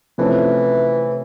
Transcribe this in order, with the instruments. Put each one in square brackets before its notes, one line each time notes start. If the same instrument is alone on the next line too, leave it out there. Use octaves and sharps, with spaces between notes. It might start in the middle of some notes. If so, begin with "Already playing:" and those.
[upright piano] C3 F3 A3 C#4 E4 [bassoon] E3